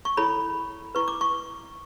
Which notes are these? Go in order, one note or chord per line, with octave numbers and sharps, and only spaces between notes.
C#6
E4 A4 C#5 B5
E4 B4 C#6
D6
C#6